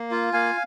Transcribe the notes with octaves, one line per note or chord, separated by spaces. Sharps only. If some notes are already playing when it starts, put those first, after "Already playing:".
Already playing: A#3
F4
A#3 F5 G#5